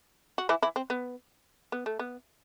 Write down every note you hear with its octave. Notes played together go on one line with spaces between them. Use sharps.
F#4
E3 E4
E3 E4
C4
B3
B3
A3
B3